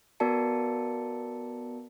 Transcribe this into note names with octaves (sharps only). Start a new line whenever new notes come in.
B3 F#4 A#4 D5 A5 C#7